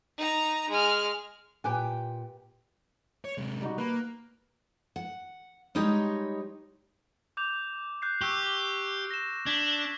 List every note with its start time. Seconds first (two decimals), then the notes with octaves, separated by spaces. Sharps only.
0.18 D#4 A#5
0.70 G#3 F6
1.64 A#2 G4 B4 G5 G#5
3.25 C#5
3.38 C3 G#3
3.62 G3 D#4 F#4
3.78 A#3 B4
4.96 F#5
5.75 G3 G#3 D#4 G4 C#5 D#5
7.37 D6 G6 F7
8.02 F#6 G6 C7
8.22 G4 C#6 E6 G6
9.11 A#6 E7
9.46 D4 G#6 B6 F#7